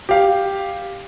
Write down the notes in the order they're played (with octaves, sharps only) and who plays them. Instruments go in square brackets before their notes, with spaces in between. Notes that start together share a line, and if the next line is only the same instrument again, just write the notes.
[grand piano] G4 F5